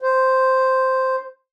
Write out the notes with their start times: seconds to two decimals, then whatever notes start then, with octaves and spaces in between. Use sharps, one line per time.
0.02 C5